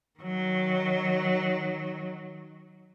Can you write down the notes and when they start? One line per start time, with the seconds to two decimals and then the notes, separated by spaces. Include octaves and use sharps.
0.19 D#3 F#3